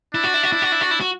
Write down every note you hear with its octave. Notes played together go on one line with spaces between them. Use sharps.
D4 E4
F#4
E4
F#4
E4
F#4
E4
F#4
E4
F#4